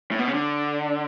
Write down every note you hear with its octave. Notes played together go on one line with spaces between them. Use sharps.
A2
B2
C#3
D3